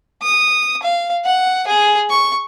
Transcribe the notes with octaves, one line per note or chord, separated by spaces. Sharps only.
D#6
F5
F#5
G#4
C#6